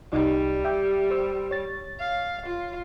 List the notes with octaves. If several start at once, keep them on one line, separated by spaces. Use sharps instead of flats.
C2 G3 D#4 D5
E5 G5 D6
G4 C5 E6
C#5 A6
F5
F4